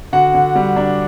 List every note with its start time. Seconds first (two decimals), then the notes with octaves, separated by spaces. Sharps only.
0.12 D3 F#4 F#5
0.34 D3
0.55 G3
0.76 D4